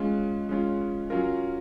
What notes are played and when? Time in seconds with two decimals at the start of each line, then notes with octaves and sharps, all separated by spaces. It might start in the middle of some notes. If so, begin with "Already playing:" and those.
Already playing: G#3 C#4 F4
0.49 G#3 C#4 F4
1.10 F#3 C#4 F4 A#4